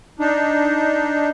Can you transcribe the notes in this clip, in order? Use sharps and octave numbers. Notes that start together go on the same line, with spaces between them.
D4 D#4